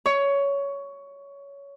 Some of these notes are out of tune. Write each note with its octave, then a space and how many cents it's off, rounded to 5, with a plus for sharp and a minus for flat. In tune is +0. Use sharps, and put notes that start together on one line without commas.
C#5 +15